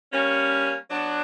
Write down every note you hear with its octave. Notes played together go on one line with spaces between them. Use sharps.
G3 A#3 C#4
F#3 B3 D4